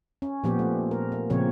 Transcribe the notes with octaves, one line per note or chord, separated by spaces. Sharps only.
C#4
A#2 F3 B3 G4
A3
A#4
A#3
A#2 C#3 F3 A#3 C4 C#5